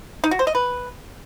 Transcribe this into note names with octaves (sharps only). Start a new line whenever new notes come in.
D#4
F#4
C5
D#5
B4